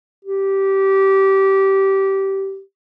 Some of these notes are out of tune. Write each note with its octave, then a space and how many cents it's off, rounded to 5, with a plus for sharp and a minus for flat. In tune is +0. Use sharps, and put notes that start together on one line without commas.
G4 -20